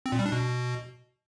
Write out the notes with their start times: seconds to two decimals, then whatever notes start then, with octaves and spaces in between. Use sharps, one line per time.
0.06 C4
0.12 A#2
0.19 G3
0.26 D4
0.32 B2